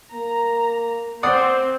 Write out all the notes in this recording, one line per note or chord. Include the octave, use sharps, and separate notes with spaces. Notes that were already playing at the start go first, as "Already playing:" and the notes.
A#3 A#5
C4 C5 D5 F#5 D#6